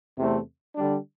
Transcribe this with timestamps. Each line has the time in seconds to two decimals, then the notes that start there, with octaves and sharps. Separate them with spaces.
0.18 E2 C3 E3 A3 C4
0.75 D3 G3 D4